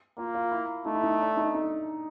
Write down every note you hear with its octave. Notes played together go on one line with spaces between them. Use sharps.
A#3 F4
F4
E4
A3 D#4
E4
D#4
D4
D#4
D#4